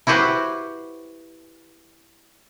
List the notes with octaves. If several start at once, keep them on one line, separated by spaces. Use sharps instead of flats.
E4 F#4 G4 B4 C5